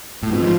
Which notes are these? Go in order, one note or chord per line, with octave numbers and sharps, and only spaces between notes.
A2
G#2 G#3 C4 F4 B4
F3